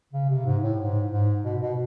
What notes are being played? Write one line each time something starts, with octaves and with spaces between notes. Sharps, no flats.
C#3
C3
G#2
A2
G#2
G#2
B2
B2